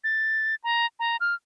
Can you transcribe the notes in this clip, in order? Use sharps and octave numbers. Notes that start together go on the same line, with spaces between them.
A6
A#5
A#5
F6